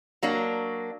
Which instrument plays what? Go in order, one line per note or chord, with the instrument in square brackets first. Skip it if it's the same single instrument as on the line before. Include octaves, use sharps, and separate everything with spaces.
[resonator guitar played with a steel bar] F#3 A#3 D4